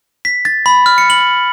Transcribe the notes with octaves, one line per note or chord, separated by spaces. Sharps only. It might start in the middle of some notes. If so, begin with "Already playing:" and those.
B6
A6
B5
F6
C#7
F#7